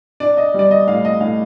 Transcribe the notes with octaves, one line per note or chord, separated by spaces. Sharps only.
D4 D5
D#5
G3 D5
D#5
A2 F5
D#5
A2 F5